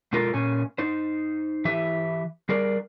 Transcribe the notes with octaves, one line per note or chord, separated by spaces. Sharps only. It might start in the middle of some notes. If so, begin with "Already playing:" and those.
B2 G#3 F4 A4 A#4
A#2 C#4 G#5
D#4 C5
E3 G4 E5
G3 G#4 A#4 D5